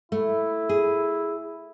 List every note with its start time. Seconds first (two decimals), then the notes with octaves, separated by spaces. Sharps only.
0.12 A3 E4
0.69 G#4